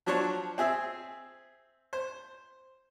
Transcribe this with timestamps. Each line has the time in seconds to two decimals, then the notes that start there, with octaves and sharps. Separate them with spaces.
0.06 F3 F#3 D4 C5 C#5
0.58 C4 G#4 E5
1.93 C5